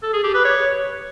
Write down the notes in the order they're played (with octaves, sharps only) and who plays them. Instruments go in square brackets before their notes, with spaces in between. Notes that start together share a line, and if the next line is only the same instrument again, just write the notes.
[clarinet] A4
G#4
G4
B4
C#5